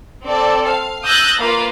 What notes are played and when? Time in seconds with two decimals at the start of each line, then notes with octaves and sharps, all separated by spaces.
0.24 C4 A4 D5
0.67 F5
1.04 D#6 E6 F#6 G6 A6 A#6
1.40 A#3 F4 B4 F5